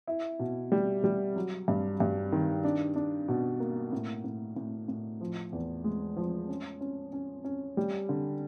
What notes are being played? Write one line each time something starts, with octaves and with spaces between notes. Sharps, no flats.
E4
B2
G3
G3
F#3
G2
G2
D#3
D4
D4
B2
A#3
A2
A2
A2
A2
F3
E2
G#3
F3
C#4
C#4
C#4
C#4
G3
D3